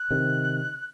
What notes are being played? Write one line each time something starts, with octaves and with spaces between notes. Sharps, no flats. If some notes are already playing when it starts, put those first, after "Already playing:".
Already playing: F#6
C3 D#3